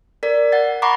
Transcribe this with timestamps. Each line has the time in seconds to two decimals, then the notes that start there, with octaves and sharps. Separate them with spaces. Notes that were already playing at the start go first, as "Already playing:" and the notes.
0.23 A#4 D5
0.52 F#5 A6
0.82 F#5 A#5 B5 C#6 D6